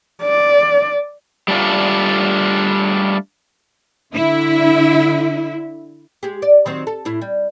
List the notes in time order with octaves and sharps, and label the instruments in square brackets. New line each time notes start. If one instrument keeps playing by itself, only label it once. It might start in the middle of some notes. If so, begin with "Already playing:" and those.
[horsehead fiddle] D5
[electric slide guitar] G3 A3 D4 F4
[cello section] D3 E4
[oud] G#3 G4
D5
D#3 F#3 C4
A4
A2 E4
G3